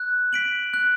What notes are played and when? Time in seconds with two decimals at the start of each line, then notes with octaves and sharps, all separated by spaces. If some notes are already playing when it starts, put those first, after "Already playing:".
Already playing: F#6
0.33 B6 D7 F#7
0.74 F#6